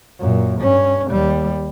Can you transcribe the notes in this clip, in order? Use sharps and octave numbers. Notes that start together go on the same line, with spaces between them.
F#2 A#2
G2 C#4
D#2 G3